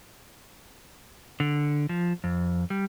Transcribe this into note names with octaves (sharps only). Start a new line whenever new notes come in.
D3
F3
F2
G3